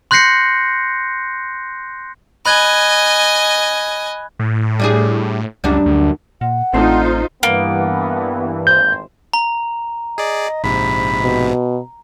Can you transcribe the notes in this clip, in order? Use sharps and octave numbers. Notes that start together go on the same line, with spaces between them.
C6 F#6 G6 A#6 C7 C#7
D#5 G#5 B5 F#6 G#6
A2
G3 D4 G#4
C#2 F#2 G3 D4
D2
A#2 F#5
A1 A3 C4 D4 D#4 F4 C5
G2 E3 A#3 B3
G#1 C5 G6
A#5
G#4 D5 D#5
A#1 G#2 C3 B5
B2